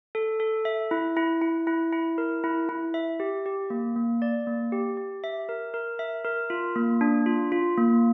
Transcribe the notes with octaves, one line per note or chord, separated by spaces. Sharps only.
A4
A4
E5
E4
E4
E4
E4
E4
A#4
E4
E4
E5
G4
G4
A#3
A#3
D5
A#3
G4
G4
E5
A#4
A#4
E5
A#4
F4
A#3
D4
F4
F4
A#3